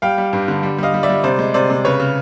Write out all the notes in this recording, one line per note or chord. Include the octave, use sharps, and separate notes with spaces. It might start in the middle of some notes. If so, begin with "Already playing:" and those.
G3 F5 G5
G3
G2
D3
G3
G3 D#5 F5
G3
D5 E5
G3
C3 C5 D5
G#3
C3 C5 D5
C3
C#3 B4 C#5
C#3